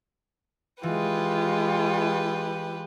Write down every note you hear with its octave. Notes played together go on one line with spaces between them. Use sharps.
E3 G#3 F4 G4 B4